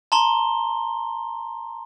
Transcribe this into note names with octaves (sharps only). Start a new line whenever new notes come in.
A5 A#5 C6 G7